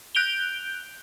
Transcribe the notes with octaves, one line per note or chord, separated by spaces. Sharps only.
F#6 G6 D7 F7 G7